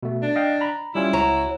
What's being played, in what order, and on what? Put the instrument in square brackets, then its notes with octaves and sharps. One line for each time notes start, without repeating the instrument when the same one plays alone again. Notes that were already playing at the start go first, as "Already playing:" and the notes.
[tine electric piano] B2 A3
[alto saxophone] D4
[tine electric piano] D#5 F5 G5
A#5 B5
[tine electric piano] G3 C#4 F4 [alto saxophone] E4
[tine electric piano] C#2 [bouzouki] F#4 C#5 A#5